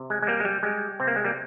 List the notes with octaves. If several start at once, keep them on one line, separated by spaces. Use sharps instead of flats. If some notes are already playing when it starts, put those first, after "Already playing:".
Already playing: C3
G#3
G#3
G3 A#3
G#3
G3
G3 G#3
C3 C4
A#3
G#3
G3 A#3